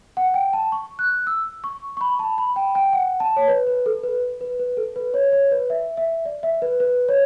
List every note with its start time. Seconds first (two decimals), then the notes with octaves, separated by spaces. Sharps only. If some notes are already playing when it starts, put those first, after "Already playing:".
0.17 F#5
0.34 G5
0.53 A5
0.72 C#6
0.99 F#6
1.27 E6
1.64 C#6
1.97 C#6
2.01 B5
2.19 A5
2.38 B5
2.56 G5
2.75 G5
2.93 F#5
3.20 A5
3.36 C#5
3.48 B4
3.67 B4
3.86 A4
4.03 B4
4.41 B4
4.59 B4
4.77 A4
4.96 B4
5.14 C#5
5.32 C#5
5.51 B4
5.70 E5
5.97 E5
6.26 D5
6.43 E5
6.62 B4
6.80 B4
7.08 C#5